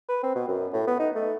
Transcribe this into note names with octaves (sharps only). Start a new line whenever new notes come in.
B4
C4
B2
F#2
A2
B3
D#4
A3